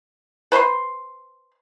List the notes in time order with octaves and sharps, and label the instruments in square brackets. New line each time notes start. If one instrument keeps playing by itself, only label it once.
[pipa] B4 C5 B5 C6